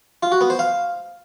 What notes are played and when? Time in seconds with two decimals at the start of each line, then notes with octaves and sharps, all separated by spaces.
0.23 F4
0.32 F#4
0.41 B3
0.50 C5
0.59 F5